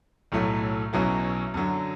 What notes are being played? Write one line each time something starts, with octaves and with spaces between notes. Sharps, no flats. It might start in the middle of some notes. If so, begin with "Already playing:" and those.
B1 A2 F#3 A3
B1 B2 F#3 C#4 E4
F#2 D3 F#3